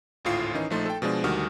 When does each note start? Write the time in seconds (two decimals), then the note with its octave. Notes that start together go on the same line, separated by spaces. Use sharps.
0.25 G#1 D2 A2 F4 C7
0.54 D#3 E3 C#4 D#4
0.70 A#1 F3 A3 D#4 C6 A6
0.86 A4 G5
1.02 B2 F3 G#3 D4
1.24 D2 D#3 G3 F#4 D#6 F6